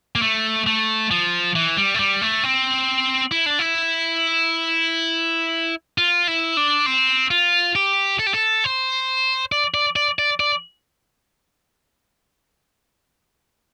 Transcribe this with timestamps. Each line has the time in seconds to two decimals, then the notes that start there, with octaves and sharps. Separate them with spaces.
0.15 A#3
0.22 A3
0.67 A3
1.11 F3
1.55 E3
1.77 G3
1.94 A3
1.99 G3
2.21 A3
2.43 C4
3.31 E4
3.46 D4
3.59 E4
5.98 F4
6.28 E4
6.57 D4
6.86 C4
7.31 F4
7.75 G4
8.19 A4
8.27 G4
8.34 A4
8.64 C5
9.52 D5
9.74 D5
9.96 D5
10.19 D5
10.40 D5